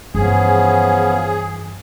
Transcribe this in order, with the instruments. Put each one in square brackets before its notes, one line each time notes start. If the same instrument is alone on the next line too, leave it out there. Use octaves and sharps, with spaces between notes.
[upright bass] G2 E3 [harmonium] F3 B3 C#4 [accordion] G#4